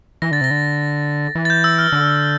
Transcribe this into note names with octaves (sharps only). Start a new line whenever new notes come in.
E3 A#6
D3 A6
C3 A#6
D3
E3
A6
G6
E6
F6
D3